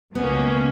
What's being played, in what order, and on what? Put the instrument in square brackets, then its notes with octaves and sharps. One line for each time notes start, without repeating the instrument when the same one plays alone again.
[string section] C#2 B2 A#3 C#4 [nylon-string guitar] B3